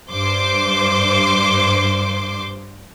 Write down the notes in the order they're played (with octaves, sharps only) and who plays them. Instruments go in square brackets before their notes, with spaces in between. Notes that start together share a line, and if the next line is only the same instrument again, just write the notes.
[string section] G2 C5 C6 D6